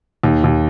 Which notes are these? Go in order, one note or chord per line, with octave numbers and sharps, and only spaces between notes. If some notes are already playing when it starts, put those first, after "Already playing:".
D#2
D#2